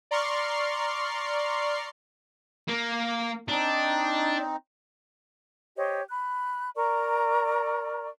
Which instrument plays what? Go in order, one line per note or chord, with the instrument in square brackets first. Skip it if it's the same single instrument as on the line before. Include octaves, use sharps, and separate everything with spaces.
[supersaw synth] D5 A#5 C6 C#6 F6 C7
[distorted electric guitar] A#3
[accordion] C4 D#4 [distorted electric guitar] D4
[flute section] G4 C5 C#5 D#5
B5 F#6
A#4 D5 A#5 C#6